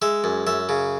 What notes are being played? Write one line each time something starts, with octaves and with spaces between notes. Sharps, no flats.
G#3 E5
F#2
F#2 E5
C#3